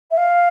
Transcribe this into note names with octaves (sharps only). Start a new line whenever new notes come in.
E5
F5